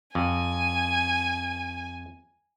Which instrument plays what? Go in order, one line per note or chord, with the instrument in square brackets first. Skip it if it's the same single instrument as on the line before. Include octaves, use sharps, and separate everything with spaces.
[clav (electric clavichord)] F2 [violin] G#5